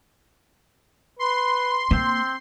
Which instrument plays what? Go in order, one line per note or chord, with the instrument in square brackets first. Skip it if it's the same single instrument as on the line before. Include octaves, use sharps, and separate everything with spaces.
[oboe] B4 [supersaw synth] C6
[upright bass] A#3 [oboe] C4